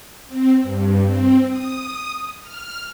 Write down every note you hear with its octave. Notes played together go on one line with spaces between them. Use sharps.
C4
G2
C4
D#6
F6